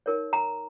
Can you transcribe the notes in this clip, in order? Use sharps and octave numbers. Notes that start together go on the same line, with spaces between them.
D#4 A#4 C#5
A#5